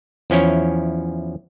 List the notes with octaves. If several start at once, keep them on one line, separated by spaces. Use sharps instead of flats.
E2 F3 C#4 E4 C#5